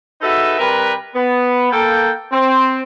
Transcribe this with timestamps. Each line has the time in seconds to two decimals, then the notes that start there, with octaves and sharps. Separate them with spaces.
0.21 D#4 F#4 G#4 A4 B4 E5
0.58 C3 G3 G4 A#4 B4
1.15 B3
1.72 A#3 A4 G5
2.32 C4